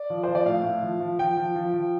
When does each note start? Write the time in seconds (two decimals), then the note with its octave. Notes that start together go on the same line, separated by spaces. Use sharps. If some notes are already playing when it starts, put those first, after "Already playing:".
Already playing: D5
0.10 F3
0.23 F3 C5
0.35 D5
0.46 A2 F5
0.63 A2
0.83 F3
1.00 F3
1.19 F3 G5
1.37 F3
1.56 F3
1.74 F3